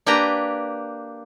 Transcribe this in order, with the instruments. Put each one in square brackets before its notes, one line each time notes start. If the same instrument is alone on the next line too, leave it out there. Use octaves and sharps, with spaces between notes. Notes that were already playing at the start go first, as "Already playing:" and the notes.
[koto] A#3 D4 G4 B4 G5 A#5